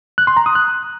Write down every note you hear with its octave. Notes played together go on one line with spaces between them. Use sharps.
F#6
C6
A#5
D#6
F#6